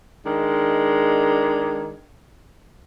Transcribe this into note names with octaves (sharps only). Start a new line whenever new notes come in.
D#3 G#3 D4